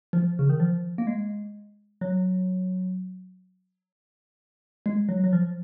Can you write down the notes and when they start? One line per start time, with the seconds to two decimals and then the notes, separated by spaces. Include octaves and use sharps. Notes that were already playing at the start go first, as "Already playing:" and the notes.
0.13 F3
0.39 C#3
0.49 D#3
0.60 F3
0.98 A#3
1.07 G#3
2.01 F#3
4.86 G#3
5.09 F#3
5.24 F#3
5.33 F3